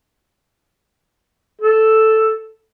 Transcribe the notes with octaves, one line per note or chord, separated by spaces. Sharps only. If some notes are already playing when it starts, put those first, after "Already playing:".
A4